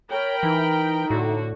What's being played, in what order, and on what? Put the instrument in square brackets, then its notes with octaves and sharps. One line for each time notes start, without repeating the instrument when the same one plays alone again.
[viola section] A#4 G5 B5 [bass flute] C#5
[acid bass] E3 [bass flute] D#4
[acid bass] A2 [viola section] D3 F#4